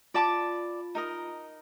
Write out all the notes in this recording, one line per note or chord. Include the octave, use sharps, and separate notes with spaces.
F4 D5 A5 D6
D#4 A#4 D#5